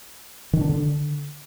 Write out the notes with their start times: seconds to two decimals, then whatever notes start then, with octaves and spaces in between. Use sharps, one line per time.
0.53 D#3
0.61 D4
0.69 D3